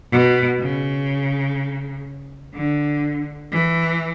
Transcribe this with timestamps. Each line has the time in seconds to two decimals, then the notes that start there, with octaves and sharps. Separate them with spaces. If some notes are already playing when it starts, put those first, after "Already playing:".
0.12 B2
0.60 C#3
2.54 D3
3.51 E3